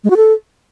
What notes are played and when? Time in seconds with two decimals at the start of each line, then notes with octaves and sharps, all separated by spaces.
0.04 G#3
0.10 F#4
0.17 A4